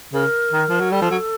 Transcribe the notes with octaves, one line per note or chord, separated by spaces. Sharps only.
C#3 A#4
D#3
F3
F#3
G3 A4
F3
F#3